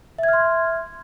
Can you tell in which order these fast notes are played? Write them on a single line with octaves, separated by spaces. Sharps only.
E5 G#6 F6 C6